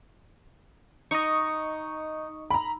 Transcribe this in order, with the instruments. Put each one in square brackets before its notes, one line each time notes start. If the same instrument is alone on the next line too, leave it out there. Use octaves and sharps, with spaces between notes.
[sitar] D#4 [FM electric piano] D#5 C#6
[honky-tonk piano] A#5 B5